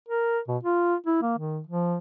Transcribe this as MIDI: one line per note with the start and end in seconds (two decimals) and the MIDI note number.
0.08 0.39 70
0.48 0.58 47
0.63 0.95 65
1.06 1.21 64
1.22 1.37 58
1.38 1.60 51
1.67 1.98 53